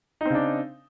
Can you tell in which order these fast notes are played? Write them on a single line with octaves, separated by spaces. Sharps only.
D#4 C4 C#3 D4